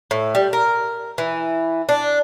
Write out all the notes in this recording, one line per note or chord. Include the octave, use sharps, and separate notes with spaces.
A2
G3
A#4
E3
D4